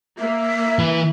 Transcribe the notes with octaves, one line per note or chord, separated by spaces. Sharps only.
A#3 E5
E3 B4